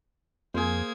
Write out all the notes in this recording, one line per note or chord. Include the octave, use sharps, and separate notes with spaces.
F2 A#3 G#4 C5 G#6